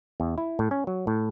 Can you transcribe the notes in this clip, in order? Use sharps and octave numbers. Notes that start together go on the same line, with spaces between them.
E2
E4
A2
C#4
F#3
A2